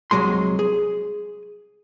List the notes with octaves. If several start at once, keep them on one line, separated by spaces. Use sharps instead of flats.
C2 G#2 F#3 G#3 C6
G#4